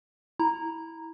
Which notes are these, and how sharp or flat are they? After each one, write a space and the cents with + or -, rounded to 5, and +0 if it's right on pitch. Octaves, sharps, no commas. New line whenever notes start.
E4 -10 A#5 +0